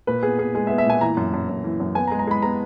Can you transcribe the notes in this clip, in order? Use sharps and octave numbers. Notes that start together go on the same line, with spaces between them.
A#2 B4
B3 G#4
B3 G#4
G#3 G#4
E5
B3
E5
A#2 G#5
E3 A#5
F#2
F#2
F#2
E3
F#2
B3 G#5
A#5
G#3
A#5
G#3 B5
B3 A#5